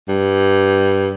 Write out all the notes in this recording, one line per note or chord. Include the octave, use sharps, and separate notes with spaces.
G2